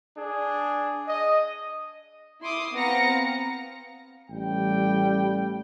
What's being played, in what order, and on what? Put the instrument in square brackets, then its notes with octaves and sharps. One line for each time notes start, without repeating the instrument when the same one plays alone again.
[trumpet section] D4 G#4
D#5
[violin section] E4 C6 D6 D#6
B3 C4 F5 A#5 A#6 C#7
[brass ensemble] A1 G3 G5